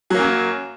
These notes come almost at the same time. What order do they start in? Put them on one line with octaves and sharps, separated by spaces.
F#3 A#3 F#2